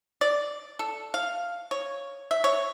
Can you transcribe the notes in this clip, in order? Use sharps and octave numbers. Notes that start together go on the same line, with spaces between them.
D5
A4
F5
C#5
E5
C#5